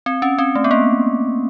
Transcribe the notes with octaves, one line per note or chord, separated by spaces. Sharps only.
C4
C#4
C4
A3
B3
A#3